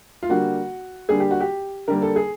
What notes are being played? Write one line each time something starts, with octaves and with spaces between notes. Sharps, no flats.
F4
D3 G3 A#3 F#4
D3 G3 A#3 G#4
G4
F#4
G4
D3 G3 A#3 A#4
A4
G#4